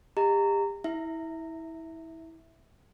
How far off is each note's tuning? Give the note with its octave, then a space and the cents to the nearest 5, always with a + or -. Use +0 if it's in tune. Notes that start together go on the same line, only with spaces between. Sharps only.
G4 +30 D#5 +0 A#5 -20
E4 -25 E5 +0